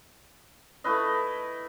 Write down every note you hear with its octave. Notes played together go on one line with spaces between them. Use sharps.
A3 E4 B4 D#5